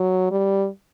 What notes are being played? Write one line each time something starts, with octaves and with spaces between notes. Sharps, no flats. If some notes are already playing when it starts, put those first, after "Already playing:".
Already playing: F#3
G3